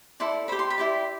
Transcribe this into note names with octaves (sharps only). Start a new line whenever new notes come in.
E4 A4 D5 C6
G4 C5 B5
C6
B5
E4 G4 D5